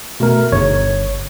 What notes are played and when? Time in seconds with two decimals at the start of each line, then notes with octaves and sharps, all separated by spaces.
0.20 B2 A3 A#4
0.52 G1 C#5